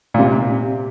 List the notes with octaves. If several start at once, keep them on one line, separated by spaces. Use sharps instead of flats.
A#2
C3